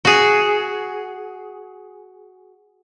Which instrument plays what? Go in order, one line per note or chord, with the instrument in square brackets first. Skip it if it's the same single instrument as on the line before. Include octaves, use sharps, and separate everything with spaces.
[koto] F#4 G#4